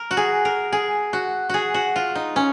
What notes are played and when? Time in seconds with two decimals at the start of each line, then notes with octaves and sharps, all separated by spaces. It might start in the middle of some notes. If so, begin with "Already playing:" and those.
Already playing: A#4
0.11 F#4
0.17 G#4
0.45 A#4
0.72 G#4
1.13 F#4
1.50 F#4 G#4
1.74 F#4
1.96 F4
2.15 D#4
2.36 C#4